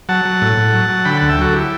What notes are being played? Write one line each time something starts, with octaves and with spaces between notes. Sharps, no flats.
F#3 F#5 A5
F#3
A2
A2
F#3
F#3
D3 G5 B5
D2 F#5 A5
E5 G5
F#3 F#4 A4
E4 G4